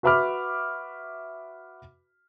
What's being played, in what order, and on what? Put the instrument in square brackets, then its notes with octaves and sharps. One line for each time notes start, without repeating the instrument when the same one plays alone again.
[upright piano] F#4 B4 E5 B5 D6 F6